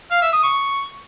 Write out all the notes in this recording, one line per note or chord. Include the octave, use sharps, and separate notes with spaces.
F5
E5
D#6
C#6